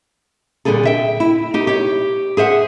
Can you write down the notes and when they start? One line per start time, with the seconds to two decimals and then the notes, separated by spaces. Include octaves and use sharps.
0.65 A#2 D3 G3 G#4 A4
0.85 E5 G5
1.20 E4
1.54 D#4 G4
1.67 G4 C#5
2.37 G#4 C5 E5 F#5